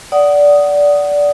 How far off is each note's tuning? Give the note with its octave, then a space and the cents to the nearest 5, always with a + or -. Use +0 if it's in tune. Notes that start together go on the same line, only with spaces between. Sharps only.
D5 -15 F#5 +15 D#6 +0